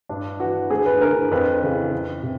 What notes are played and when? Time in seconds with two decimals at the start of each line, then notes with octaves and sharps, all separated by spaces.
0.09 G2 D4
0.40 E3 F#4
0.70 D2 G#4
0.86 B4
1.01 D3 A#4
1.31 F2 B4
1.61 C#3 E3
1.92 F2
2.23 C3